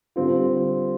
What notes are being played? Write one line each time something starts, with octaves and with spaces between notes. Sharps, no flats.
D3 G3 C4 F4